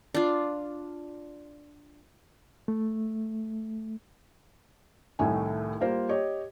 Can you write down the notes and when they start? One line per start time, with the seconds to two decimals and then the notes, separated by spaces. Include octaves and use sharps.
0.14 D4 F4
2.68 A3
5.19 C2 A2 D#3 A3 G#5
5.80 G3 A#3 F4 A#4 C5
6.09 G4 C#5 D#5